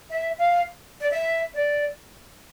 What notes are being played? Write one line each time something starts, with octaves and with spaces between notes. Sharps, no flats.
E5
F5
D5
E5
D5